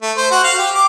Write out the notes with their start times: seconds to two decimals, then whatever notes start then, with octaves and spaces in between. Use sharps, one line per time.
0.02 A3
0.17 C5
0.31 F#4
0.44 F5
0.59 G4
0.74 D6